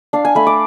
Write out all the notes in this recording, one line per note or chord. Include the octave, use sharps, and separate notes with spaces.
D4 F5
G#5
A3 B5
D6